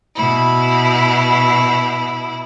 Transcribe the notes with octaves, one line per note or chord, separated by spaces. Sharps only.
B2 E4